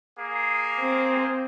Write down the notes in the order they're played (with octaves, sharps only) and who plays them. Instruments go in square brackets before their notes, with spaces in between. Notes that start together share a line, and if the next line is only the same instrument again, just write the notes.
[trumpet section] A#3 G#4
[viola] C4